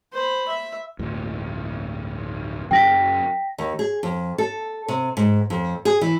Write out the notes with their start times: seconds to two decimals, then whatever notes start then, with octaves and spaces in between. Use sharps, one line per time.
0.13 C5 B5
0.48 E5
0.99 D1 G2
2.71 F#2 C#3 F#3 G5 A#6 B6
3.58 D#2
3.79 G#4
4.03 F2
4.38 A4
4.88 C3
5.17 G#2
5.50 F2
5.85 G#4
6.01 E3